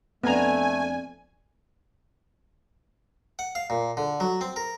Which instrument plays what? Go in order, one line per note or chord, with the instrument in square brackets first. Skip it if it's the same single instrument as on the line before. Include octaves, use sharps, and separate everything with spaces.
[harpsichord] F2 D4 [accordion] A3 [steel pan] B3 A#5 [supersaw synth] G#5
[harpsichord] F#5
F5
A#2
D3
F#3
C4
A#4